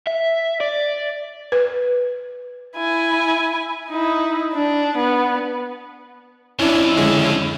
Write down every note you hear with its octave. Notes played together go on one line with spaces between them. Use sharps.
E5
D5
B4
E4 G#5
D#4 E4
D4
B3
F2 C#4 D4 E4
D3 G#3 C#4